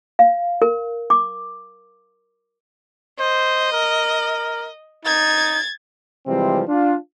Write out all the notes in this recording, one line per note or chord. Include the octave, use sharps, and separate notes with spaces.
F5
A#4
D6
C5 D#5
A#4
D#4 G#6 A6
C3 E3 F3 G3 G#3 C4
D4 F4